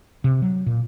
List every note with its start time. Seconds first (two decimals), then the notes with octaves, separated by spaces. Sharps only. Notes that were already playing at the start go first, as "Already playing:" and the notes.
0.24 C3
0.42 F#3
0.66 A#2